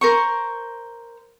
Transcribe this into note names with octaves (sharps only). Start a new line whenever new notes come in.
A#4 C5 C#6